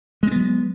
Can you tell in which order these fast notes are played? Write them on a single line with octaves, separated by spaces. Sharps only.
G#3 C4 B3 F#3